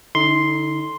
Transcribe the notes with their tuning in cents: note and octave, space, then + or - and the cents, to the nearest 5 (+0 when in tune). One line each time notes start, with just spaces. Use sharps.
D3 +0 D#4 +45 C6 +0